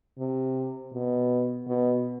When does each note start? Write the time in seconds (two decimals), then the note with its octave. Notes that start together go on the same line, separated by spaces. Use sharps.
0.18 C3
0.93 B2
1.67 B2